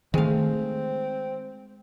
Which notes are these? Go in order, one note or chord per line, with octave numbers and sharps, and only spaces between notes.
D#3 G#3 A3 C4 F5